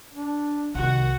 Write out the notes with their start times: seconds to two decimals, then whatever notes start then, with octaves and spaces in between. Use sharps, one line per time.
0.14 D4
0.75 C2 D#3 F#4 F#5